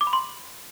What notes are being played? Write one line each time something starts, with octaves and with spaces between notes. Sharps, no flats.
D6
B5
C6